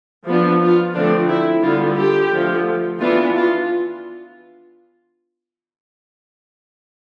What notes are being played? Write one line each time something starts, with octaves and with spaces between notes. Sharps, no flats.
F3 B3 D4
F4
D3 F3 A3 C4 D4
E4
D3 G3 B3 F4
G4
D3 F3 A3
E3 B3 D4 F4
F4